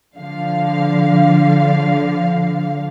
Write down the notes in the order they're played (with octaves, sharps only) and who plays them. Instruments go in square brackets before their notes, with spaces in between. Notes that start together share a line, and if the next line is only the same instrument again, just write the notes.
[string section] D3 F3 F5